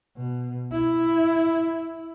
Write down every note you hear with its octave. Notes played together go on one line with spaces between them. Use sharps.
B2
E4